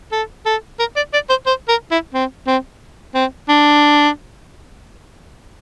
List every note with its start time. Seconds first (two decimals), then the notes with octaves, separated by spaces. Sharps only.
0.12 A4
0.46 A4
0.79 A#4
0.96 D5
1.13 D5
1.29 C5
1.46 C5
1.68 A#4
1.91 E4
2.14 C4
2.47 C4
3.15 C4
3.49 D4